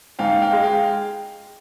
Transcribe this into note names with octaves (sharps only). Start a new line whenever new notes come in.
G#2 F5 G5
F5 G5
G#3
F5 G5